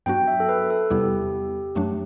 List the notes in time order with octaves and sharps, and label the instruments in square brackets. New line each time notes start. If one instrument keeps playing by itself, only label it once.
[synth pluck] G2 F#3 B3 D4 F#4 [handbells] G5
[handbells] E5
A4
B4
A4
[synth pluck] E2 C3 G3 B3 E4 [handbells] G4
[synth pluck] F#2 F#3 A3 D4